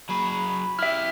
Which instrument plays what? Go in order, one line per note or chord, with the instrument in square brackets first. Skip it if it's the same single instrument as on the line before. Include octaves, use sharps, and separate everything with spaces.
[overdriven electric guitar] F#3 G#4 [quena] B5
[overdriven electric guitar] E4 G4 [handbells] E5 F6